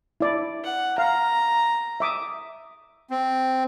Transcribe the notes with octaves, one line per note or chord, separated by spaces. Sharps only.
E4 D5
F#5
F5 A#5
E5 D6 D#6
C4